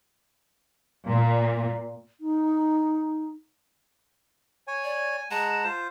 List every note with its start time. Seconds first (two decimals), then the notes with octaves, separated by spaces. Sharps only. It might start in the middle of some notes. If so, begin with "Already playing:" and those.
1.09 A#2
2.20 D#4
4.68 C#5 G#5
4.84 D5
5.18 G#5
5.31 G#3 F#5 A5 A#5
5.64 F4 C5